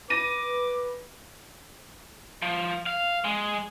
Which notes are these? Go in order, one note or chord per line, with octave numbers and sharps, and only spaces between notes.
B4 D6 A#6 D#7
F3
F5
G#3